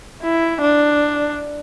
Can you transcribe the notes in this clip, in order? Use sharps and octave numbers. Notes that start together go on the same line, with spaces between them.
E4
D4